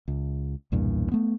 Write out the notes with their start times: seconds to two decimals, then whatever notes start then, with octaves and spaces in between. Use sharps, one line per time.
0.08 C#2
0.72 B1 E2 G2 A#2
1.12 A3 B3